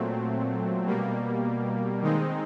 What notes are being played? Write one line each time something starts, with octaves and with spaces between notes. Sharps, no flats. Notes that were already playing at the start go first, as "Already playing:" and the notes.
Already playing: A#2 F#3 A3 C4
B2 G3 A#3
D#3 G#3 C4 D#4